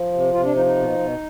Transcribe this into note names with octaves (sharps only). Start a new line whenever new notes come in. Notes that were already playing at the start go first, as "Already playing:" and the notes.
Already playing: F3
C3
C3 F4
D4
F3 D#4
D#4
B2
B2